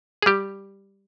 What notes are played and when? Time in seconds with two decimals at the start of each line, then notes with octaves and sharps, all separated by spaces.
0.22 G#4
0.26 G3 G4